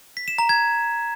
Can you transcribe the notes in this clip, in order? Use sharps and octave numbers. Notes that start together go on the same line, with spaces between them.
B6
E7
A#5
G#6